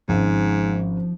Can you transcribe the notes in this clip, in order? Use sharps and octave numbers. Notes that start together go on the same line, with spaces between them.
G#1 G#2 C#3 F3